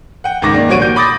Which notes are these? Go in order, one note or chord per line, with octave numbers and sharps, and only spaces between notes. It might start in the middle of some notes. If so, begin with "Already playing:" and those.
F#5 G5
C#2 G#2 D#3 D6 A#6
D#3 A#3 D4
A#1 G3 F#4 C#5 D7 D#7
A#2 G6
B5 D6 D#6 A6 A#6